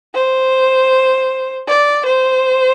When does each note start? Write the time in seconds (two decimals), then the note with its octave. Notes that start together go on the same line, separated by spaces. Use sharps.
0.14 C5
1.68 D5
2.06 C5